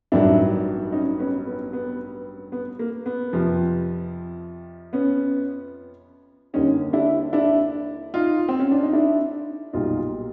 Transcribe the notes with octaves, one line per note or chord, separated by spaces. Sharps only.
A1 G2 D#3 F#3 D4 E4
C#4 D#4
B3 C#4
B3
B3
B3
A#3
B3
F2 C3 F3
B3 C#4
D#2 D3 G3 C#4 D#4
D4 E4
D4 E4
D#4 F4
C4
C#4
D4
D#4
D4 E4
B1 A#2 G3 D#4 F4